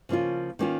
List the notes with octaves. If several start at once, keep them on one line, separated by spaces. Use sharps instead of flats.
C#3 F3 A#3 C#4 F4
D#3 A#3 C#4 F4